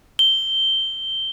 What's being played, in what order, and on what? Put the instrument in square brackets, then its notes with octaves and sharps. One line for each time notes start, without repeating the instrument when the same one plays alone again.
[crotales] G7